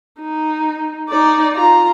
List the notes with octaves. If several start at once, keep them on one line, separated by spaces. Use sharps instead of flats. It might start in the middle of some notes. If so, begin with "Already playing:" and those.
D#4
D#4 D5
F4 A#5